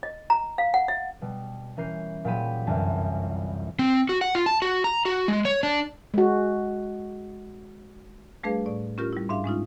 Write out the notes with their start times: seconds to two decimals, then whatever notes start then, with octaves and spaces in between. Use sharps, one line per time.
0.03 D#5
0.30 A#5
0.58 F5
0.74 F#5
0.88 E5
1.21 B2 G3
1.77 E3 C#4 A#4 G6 C7
2.25 A#2 F#3 G4 G#4 B5 D#7
2.67 G1 C2 F#2 E3 G#5 A5
3.79 C4
4.09 F#4
4.21 F#5
4.35 F4
4.46 A5
4.62 F#4
4.84 A#5
5.05 F#4
5.28 G#3
5.45 C#5
5.63 D4
6.14 G#3 F#4
8.44 G3 A3 D4 G#4 B4 F5
8.66 A2 D5
8.98 C#4 F4 G4 A#4 F6
9.13 G3 E4
9.29 G#2 D4 E5 F5
9.44 G#3 C#4 D#4 F4